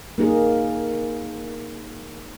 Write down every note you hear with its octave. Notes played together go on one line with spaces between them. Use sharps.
A#3 D#4 G#4 A#4